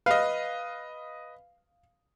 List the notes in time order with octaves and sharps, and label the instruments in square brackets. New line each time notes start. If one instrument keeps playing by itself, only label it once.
[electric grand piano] B4 D#5 [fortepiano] F5